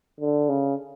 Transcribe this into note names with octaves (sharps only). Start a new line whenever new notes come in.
D3
C#3